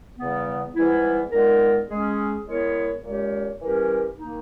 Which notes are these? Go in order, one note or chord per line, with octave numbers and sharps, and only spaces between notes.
E2 C#3 G3 B3
G#2 E3 G3 B3 E4
A#2 G#3 B3 D#4 A#4
G#3 C#4 G#4
G#3 B3 E4 A#4 C#5
A#2 G#3 C#4 G4 C#5
E3 G3 C#4 G4 A#4
D#3 A#3 D#4